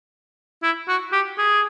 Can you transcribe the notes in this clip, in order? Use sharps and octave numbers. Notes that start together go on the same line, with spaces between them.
E4
F#4
G4
G#4